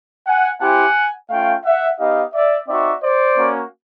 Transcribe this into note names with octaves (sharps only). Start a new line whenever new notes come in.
F#5 G#5
C4 E4 G4 F#5 G#5
A3 C#4 F4 F5 G5
E5 F#5
B3 D#4 G4 D#5 F5
D5 E5
C4 D#4 F#4 D5 E5
C5 D5
A#3 C#4 F#4